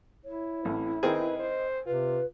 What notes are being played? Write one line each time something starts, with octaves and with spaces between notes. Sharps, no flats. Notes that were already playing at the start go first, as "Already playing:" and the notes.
E4 C#5
A1 A2 C4
D#3 C4 G#4 B4 D#5
C5
C3 F4 B4